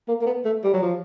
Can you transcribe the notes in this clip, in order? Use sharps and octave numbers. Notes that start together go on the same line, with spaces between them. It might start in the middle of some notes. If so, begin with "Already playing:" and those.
A#3
A#3
B3
A3
G3
F#3
F3